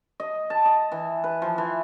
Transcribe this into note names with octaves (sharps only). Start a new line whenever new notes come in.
D#5
A5
D#5
E3
B4
F3
E3